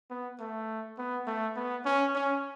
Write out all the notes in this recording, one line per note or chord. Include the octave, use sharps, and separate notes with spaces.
B3
A3
B3
A3
B3
C#4
C#4